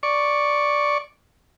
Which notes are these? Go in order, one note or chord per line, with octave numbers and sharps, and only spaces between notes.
D5 C#6